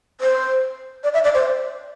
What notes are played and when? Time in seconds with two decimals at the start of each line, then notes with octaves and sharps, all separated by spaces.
0.21 C5
1.04 D5
1.14 E5
1.24 D5
1.34 C5